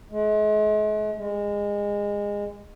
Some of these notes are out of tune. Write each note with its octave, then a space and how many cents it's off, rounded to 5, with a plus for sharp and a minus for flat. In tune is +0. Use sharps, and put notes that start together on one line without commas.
G#3 +40
G#3 -25